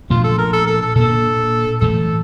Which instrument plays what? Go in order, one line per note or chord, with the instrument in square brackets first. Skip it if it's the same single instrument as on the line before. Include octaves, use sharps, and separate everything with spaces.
[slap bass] A#2 F3 A3 D4 [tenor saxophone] F4
[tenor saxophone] A4
A#4
A4
A4
A4
[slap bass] A#2 G3 A#3 D4 [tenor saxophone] A4
[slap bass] A2 E3 A3 [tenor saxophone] A4